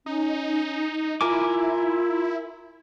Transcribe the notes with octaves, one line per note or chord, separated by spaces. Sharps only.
C#4 D#4
E4 F4 A#4 G#5 D6